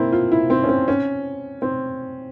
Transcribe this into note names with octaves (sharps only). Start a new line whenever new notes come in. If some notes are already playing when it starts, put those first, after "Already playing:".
Already playing: A#3 C4 E4
F4
E4
C4
C#4
C4
C#4
C4